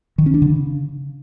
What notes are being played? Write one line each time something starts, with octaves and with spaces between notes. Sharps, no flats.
D#3
C#4
D4
D3
C#3